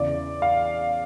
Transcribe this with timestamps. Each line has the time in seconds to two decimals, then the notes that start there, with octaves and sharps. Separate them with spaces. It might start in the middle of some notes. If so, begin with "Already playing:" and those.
Already playing: E2 C#3 E3 D5
0.42 F5